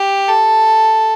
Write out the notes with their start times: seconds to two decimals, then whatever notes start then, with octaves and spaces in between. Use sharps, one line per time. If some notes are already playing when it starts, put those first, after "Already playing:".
Already playing: G4
0.29 A4